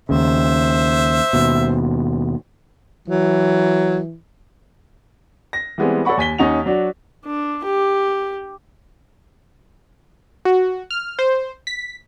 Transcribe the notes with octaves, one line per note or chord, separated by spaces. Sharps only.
D#2 C#3 C5 E5
D#2 B2
E3 F#3
A#6
E3 G3 G#3 B3 C4
A4 C#5 D5 F#5 B5 C#6
D#2 G#5 B6 G7
D#2 C#4 D#4 F#5 F7
F#3 D4 F#4
D4
G4
F#4
F6
C5
B6